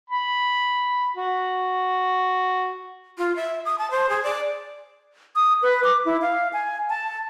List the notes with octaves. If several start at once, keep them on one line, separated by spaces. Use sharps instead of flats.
B5
F#4
F4
E5
D#6
A5
C5
G#4
D5
D#6
B4
D6
E4
F5
G#5
A5